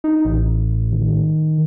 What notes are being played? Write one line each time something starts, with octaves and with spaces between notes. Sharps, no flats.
D#4
A1
D#3